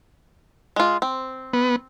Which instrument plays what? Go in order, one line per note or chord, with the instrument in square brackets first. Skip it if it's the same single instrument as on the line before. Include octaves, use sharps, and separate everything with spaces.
[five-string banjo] G#3 F4
C4
[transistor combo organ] B3